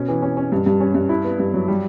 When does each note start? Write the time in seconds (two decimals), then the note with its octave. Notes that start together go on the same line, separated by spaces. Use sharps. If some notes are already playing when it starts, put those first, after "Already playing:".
Already playing: B2 C#4
0.08 E3
0.22 C#4
0.37 C#4
0.52 G2
0.66 G2
0.80 C#4
0.95 G2
1.09 E4
1.25 B3
1.39 G2
1.54 F#3
1.68 G3